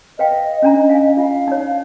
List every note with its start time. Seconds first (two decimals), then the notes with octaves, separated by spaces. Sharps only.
0.19 B4 D#5 F5 G5
0.62 C#4 D4 A#5
0.90 F5 G#5
1.17 F4 F5
1.48 D#4 C#5